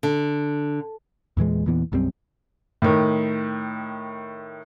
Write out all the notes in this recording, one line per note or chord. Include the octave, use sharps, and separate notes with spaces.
D3
E2 A#2 E3 G#3
E2 A#2 E3 B3
B1 F#2 G3 C4
A2 D#3